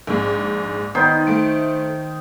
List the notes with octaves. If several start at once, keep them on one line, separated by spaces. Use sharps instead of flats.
A#1 G#2
D#3 B3 D#4 C5
A3 D7